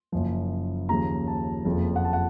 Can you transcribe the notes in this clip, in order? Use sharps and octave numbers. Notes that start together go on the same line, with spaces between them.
F#1 F#2 F3
D#2 C#3 F3 A#5
A5
F#1 F2 C#3 F3
F#5
A5
F#5